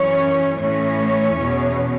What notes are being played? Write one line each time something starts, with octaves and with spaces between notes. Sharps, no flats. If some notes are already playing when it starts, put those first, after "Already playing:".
Already playing: F#2 E3 C#4 C#5
A2 E3 C#4 C#5
E2 B2